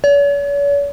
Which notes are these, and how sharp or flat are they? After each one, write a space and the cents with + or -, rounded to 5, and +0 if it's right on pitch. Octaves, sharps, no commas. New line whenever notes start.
C#5 +45